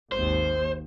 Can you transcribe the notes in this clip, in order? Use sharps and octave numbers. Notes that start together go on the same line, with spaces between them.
G#1 D#2 C5